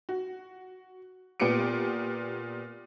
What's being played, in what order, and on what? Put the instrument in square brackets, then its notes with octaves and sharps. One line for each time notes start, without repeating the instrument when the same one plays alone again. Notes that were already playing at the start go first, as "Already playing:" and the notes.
[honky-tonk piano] F#4
A#2 B3 G4 C#7 D7